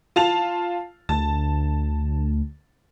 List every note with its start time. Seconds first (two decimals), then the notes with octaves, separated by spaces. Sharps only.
0.16 F4 A5 F7
1.09 D2 A5